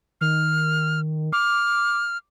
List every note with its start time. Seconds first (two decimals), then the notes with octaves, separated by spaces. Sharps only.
0.21 D#3 F6
1.33 D6 F6